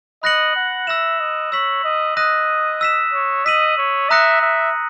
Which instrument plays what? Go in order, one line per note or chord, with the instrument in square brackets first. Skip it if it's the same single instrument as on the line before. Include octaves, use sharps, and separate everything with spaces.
[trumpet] D#5 [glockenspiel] B5 F#6 A#6 C#7 F#7
[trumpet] F#5
[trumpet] E5 [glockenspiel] E6 A#6 E7
[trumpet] D#5
[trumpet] C#5 [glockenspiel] E6 B6 F#7
[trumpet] D#5
[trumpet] D#5 [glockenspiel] D#6 F#6 A#6 D#7
[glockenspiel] E6 B6 E7
[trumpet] C#5
[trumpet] D#5 [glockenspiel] E6 B6 D#7 F#7
[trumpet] C#5
[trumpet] E5 [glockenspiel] A#5 D#6 F#6 A#6 C#7
[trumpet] E5